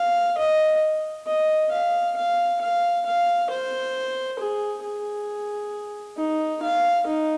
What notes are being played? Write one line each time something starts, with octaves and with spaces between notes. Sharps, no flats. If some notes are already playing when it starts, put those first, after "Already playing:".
Already playing: F5
D#5
D#5
F5
F5
F5
F5
C5
G#4
G#4
D#4
F5
D#4